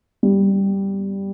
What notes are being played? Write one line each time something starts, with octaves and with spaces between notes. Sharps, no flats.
G3